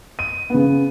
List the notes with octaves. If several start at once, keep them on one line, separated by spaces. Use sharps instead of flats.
D#7
C#3 B3